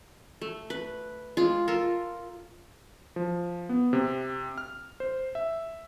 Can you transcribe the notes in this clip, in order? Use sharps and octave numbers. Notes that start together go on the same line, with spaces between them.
A3
B4
G#3 F4
F4 A4 A#4
F3
B3
C3
F6
C5
E5